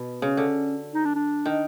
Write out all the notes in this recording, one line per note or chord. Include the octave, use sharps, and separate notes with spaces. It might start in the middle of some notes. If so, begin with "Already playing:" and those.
Already playing: B2
C#3 C#4
D3
D#4
D4
D4
D#3